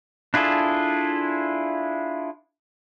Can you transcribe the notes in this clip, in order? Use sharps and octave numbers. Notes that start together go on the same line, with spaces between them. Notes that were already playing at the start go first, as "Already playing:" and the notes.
D4 E4 F4 G#4 A4